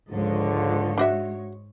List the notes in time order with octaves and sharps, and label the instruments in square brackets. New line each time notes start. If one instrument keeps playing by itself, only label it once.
[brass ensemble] C#2 D3 F3 [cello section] G#2 G#3 C#5
[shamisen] D4 F#4 E5